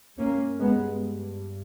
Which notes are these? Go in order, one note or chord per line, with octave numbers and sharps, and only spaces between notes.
G2 A#3 C#4
G#3 B3